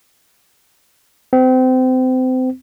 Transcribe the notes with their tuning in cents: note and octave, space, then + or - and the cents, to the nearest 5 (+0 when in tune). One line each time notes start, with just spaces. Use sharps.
C4 -30